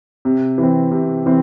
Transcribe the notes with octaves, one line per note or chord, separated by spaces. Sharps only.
C3
E3 C4
C3
E3 C4